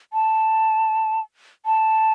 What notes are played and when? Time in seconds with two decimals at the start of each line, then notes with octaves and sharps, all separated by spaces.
0.13 A5
1.66 A5